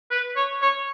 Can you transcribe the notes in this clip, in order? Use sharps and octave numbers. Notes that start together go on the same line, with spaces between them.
B4
C#5
C#5